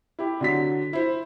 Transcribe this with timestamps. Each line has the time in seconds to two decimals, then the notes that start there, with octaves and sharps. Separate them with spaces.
0.19 E4 G4
0.41 D3 F#3 B6
0.93 E4 C5